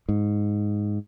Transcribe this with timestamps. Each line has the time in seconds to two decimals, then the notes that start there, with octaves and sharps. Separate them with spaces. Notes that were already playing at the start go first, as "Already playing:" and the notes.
0.09 G#2